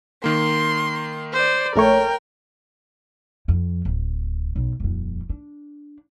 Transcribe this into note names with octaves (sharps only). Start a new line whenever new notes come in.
D#3 A#3 C6
C5 D5
A#1 A3 A#4 C#5 G5
F2
D1
B1
D#1 F2
D4